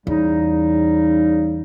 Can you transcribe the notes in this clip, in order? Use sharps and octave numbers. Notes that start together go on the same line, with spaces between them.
E2 C#3 G3 D#4